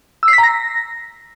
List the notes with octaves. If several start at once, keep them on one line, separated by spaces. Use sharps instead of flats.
E6
C7
B6
A#5
A#6